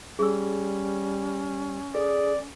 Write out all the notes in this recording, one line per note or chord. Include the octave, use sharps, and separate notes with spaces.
G3 C#4 G#4 C#6 E6
G#4 A4 D5